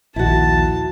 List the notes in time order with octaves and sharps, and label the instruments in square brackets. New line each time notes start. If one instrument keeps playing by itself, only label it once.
[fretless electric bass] A#1 D#2 [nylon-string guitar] E4 F#4 [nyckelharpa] A5